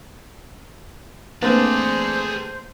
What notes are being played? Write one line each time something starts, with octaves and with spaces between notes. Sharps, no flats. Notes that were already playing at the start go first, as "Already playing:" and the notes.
A3 A#3 C4 D4 G#4 B4 C5 D5